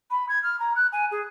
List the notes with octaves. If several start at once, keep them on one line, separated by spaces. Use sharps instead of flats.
B5
G#6
F6
A#5
F#6
G#5
G#4